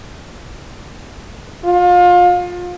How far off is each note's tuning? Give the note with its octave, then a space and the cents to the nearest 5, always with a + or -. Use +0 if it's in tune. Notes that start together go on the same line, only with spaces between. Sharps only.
F4 +30